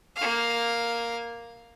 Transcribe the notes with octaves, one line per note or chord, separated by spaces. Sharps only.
A#3 F5